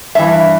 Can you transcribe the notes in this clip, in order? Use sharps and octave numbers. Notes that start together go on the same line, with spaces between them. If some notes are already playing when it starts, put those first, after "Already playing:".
G2 E3 E5